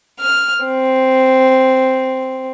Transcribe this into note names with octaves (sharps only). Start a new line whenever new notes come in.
F6
C4